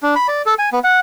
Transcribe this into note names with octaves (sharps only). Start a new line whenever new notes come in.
D4
B5
D5
A4
G#5
B3
F#5